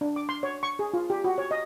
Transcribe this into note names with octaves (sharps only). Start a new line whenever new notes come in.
D4
D6
C6
C#5
C#6
G#4
F4
G4
F#4
C#5
D#5